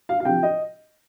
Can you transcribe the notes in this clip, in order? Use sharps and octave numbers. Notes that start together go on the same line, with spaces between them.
F5
F5
C3 F3 G5
D#5